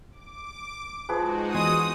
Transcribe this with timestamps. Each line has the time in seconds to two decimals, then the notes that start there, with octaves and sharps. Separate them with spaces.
0.11 D6
1.09 F3 G#3 D#4 F#4 G#4 B4
1.54 E2 G#5 C6 D#6